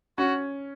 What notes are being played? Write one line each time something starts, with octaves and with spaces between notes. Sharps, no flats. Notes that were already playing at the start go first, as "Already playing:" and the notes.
C#4 F#4